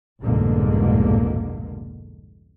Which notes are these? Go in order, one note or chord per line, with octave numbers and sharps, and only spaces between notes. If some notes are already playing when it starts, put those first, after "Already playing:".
F1 C2 G#2 B2 D3 A#3